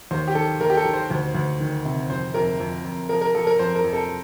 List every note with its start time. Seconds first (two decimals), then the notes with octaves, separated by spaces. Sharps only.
0.11 D#2 C5
0.28 G4
0.35 D#3 A4
0.60 D#2 A#4
0.70 G4
0.77 A4
0.85 D#3
0.93 C5
1.11 D2
1.35 D2
1.60 D#3
1.85 C3
2.10 F2 C5
2.34 F2 A#4
2.60 F2
2.84 F2
3.09 F3 A#4
3.22 A#4
3.35 F3 A4
3.47 A#4
3.59 F2 C5
3.76 A#4
3.84 F2
3.93 A4